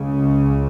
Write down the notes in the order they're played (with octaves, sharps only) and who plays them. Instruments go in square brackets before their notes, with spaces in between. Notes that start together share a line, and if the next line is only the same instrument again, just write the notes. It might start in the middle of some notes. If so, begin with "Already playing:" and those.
Already playing: [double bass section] C#2 C#3